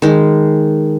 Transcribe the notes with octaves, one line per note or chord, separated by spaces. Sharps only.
D#3 G#3